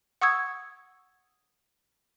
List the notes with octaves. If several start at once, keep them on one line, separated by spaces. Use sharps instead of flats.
F#5 C#6 D#6 E6 G#6